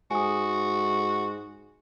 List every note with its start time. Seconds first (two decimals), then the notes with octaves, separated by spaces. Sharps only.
0.11 G#2 F#4 G#5 D#6